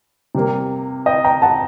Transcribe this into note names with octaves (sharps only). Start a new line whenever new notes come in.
C3 G3 A#3
D#5 G5
G5 A#5
F#5 A5